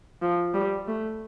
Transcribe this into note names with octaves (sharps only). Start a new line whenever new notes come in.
F3
G3
A3